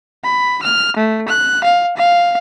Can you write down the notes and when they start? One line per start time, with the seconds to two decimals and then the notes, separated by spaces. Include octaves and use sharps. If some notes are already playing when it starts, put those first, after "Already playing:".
0.24 B5
0.63 F6
0.97 A3
1.29 F#6
1.64 F5
1.97 F5